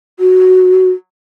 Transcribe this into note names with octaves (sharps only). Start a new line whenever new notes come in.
F#4